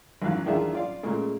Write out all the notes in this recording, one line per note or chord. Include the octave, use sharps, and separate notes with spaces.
G#1 F#2 E3 F5 F#6
E2 D#3 D4 F4 G#4 E5
F4 D5 F5
A#2 C#3 G#3 A3